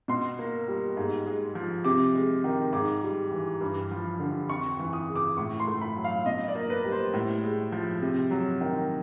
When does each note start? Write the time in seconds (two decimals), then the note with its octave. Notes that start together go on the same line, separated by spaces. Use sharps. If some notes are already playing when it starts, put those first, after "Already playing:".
0.08 B2 C6
0.39 A#3
0.68 G3
0.97 G#2
1.26 G#3
1.55 F3
1.85 C3 D6
2.15 G#3
2.44 D#3
2.73 G#2 D6
3.03 G3
3.31 E3
3.61 G2
3.91 F3
4.20 D3
4.49 F2 C#6
4.72 C#6
4.79 E3
4.93 D#6
5.08 C#3
5.16 D6
5.37 A2 C#6
5.60 C6
5.67 A3
5.81 B5
5.97 F#3
6.04 F5
6.26 B2 D#5
6.48 D5
6.55 A#3
6.70 B4
6.85 G3
6.92 C5
7.14 A2
7.43 G#3
7.72 F3
8.02 C3
8.31 F#3
8.61 D#3